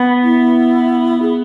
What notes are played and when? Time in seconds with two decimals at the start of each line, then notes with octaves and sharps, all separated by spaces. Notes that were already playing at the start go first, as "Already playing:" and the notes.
Already playing: B3
0.23 E4
1.22 G#4